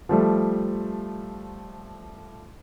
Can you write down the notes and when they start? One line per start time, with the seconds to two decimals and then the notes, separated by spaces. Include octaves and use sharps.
0.09 F3 G3 A3